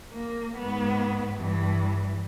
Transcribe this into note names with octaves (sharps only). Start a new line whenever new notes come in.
A#3
G#2 B3
G2 E3